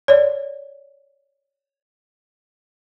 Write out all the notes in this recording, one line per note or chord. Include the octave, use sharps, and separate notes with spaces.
C#5 D5